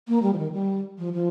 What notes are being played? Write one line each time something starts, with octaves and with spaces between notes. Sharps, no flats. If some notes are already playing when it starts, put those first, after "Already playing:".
A#3
G3
F3
D#3
G3
F3
F3